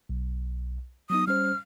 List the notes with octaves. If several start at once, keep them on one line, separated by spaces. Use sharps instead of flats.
B1
F#3 B3 D#4 D#6
G3 C#4 C5 F6